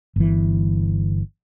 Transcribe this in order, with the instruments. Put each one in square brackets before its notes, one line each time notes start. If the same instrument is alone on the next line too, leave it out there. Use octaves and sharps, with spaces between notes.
[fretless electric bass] G1 E3